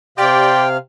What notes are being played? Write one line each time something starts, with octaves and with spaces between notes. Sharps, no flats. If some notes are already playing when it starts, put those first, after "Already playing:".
C3 G4 D5 F5 G5 C6